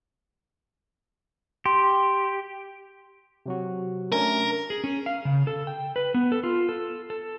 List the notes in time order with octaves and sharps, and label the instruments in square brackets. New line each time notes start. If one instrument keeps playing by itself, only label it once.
[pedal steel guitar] G4 [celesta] C6
[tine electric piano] C3 F#3 F#4
[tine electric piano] A3 C#4 D4 [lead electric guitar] A#4
[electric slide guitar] G#4
C#4
F5
C#3
A4
G5
B4
B3
A4
F4
A4
A4